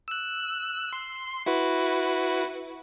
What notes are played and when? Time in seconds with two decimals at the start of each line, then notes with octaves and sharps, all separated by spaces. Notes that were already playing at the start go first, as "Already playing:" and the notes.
0.08 E6 F#6
0.93 C6
1.46 E4 F#4 B4